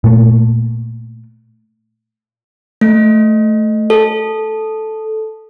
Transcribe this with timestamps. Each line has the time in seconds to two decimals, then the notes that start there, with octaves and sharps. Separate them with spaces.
0.04 A#2 A3
2.81 A3
3.90 A4